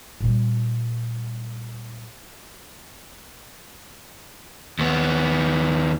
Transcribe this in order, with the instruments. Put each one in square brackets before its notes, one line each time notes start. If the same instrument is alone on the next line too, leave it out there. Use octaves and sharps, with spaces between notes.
[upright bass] A#2 G3
[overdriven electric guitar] D#2 B3